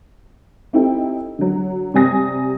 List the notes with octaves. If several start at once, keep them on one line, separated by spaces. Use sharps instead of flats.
C4 D#4 E4 G4 A4 G5
D3 F#3
C3 G3 C4 G#5 D#6 A#6